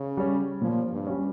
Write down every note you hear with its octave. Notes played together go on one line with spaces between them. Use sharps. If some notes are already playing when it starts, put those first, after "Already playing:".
Already playing: C#3
G3 C#4
A#2 F3
G2
G3 C#4